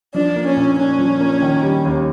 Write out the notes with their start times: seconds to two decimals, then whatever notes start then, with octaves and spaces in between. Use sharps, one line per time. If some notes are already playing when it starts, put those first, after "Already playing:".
0.14 F3 D4
0.36 A#3
0.46 C#4
0.56 A#2
0.78 C#4 D4
0.99 F3
1.20 A#3
1.42 D#3
1.63 G3
1.85 D#2